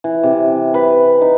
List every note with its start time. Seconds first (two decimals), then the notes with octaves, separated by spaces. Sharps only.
0.04 E3
0.23 C3
0.74 B4
1.21 D#4